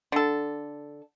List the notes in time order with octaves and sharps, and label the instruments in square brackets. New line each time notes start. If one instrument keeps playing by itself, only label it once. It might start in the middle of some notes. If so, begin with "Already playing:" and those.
[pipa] D3 A4